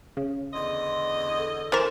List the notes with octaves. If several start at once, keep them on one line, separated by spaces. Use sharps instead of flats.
C#3
E2 D3 D#5 C6
A4
E3 A#4 C5 A6 E7